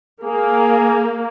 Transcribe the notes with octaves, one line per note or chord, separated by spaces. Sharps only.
A#3 G#4